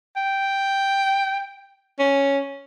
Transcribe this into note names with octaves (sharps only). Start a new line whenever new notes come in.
G5
C#4